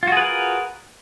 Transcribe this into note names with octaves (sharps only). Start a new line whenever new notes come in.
F4 F#4 G#4 A#4 B4